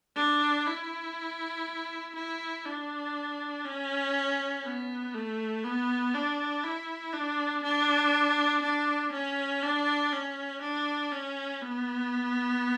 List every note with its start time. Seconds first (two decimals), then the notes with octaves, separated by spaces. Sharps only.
0.16 D4
0.66 E4
2.16 E4
2.65 D4
3.65 C#4
4.64 B3
5.14 A3
5.64 B3
6.14 D4
6.63 E4
7.13 D4
7.63 D4
8.62 D4
9.12 C#4
9.63 D4
10.12 C#4
10.62 D4
11.12 C#4
11.62 B3